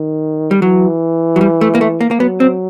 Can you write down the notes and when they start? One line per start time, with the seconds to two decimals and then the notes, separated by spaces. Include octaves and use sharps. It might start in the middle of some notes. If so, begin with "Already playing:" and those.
Already playing: D#3
0.51 G3
0.62 E3 F#3
1.36 F#3
1.41 G3
1.61 A3
1.75 A#3
1.81 A3
2.01 A#3
2.11 A#3
2.20 F#3 B3
2.40 C4